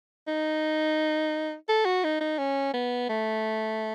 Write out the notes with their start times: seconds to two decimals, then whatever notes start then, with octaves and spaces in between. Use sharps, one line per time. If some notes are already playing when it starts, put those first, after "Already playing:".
0.27 D#4
1.69 A4
1.85 F#4
2.04 D#4
2.20 D#4
2.38 C#4
2.73 B3
3.09 A3